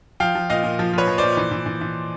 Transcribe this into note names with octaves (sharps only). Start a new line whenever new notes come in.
F3 F5 G5
F3
A#2 D#5 F5
A#2
F3
F3 B4 C#5
F3
A#2 C5 D5
E3
E3
E3
E3